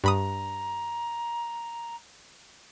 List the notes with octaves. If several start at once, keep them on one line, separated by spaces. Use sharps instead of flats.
G2 A#5 B5 D#6